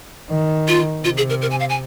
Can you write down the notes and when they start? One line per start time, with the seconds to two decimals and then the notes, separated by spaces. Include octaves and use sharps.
0.30 D#3
0.68 F4
1.04 C3 F4
1.17 G#4
1.30 A#4
1.42 A#4
1.51 G#5
1.60 F5
1.69 G#5